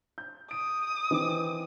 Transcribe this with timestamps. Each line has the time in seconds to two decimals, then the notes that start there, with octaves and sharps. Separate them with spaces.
0.18 G6
0.51 D#6 D7
1.11 D#3 E3 C4